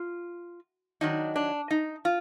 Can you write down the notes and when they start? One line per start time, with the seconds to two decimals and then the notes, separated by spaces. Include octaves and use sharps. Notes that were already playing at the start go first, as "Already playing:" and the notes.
Already playing: F4
1.01 D#3 F#3 D4 D#4
1.36 D4
1.71 D#4
2.05 F4